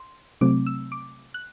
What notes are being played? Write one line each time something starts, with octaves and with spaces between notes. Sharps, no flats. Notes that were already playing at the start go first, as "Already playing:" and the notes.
Already playing: C6
C3 F#3 A3 C4 D6
E6
D6
F#6